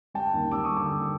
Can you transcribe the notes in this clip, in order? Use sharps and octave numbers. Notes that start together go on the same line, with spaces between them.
G3 G5 A5
D#2
G3 D6 E6
C#6 D#6
D3
D6 E6
D#2